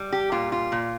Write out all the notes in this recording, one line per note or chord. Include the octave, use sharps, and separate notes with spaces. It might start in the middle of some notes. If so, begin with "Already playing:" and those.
Already playing: G3
G4
A#2 F4
F4
A#2